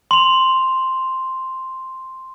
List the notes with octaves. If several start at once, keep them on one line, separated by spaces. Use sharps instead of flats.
C6 F7